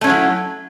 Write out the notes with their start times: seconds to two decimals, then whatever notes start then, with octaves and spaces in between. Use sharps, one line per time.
0.01 A3
0.04 C#4
0.07 F#3
0.09 E4